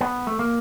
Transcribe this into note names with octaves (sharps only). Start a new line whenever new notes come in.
B3
A3
A#3